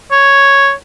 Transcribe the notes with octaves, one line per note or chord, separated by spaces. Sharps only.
C#5